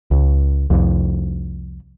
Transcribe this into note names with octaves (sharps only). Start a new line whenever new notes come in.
C#2
C2 F2